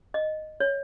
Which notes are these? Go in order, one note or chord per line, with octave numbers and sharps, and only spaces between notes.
D#5
C#5